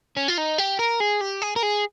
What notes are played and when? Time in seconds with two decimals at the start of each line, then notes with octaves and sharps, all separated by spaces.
0.17 C#4
0.28 F4
0.38 D#4
0.58 G4
0.79 A#4
1.00 G#4
1.21 G4
1.42 G#4
1.56 A#4
1.63 G#4